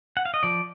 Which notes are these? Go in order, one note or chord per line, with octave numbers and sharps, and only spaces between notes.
F#5
F5
D#5
F3 D5